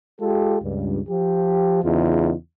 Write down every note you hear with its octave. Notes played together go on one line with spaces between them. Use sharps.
G#3 F4 G4 A4
C#2 G2
F3 G4
E2 C#3 D#4 F4